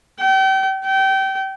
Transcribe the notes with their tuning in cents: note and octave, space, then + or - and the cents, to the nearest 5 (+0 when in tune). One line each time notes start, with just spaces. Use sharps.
G5 -35
G5 -25